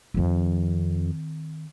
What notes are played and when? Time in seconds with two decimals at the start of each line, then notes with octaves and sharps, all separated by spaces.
0.14 F2 D#3 C4